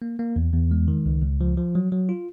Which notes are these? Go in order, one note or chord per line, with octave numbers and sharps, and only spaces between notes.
A#3
A#3
E2
E2
G#3
D#3
C#2
C#2
F3
F3
F#3
F#3
F4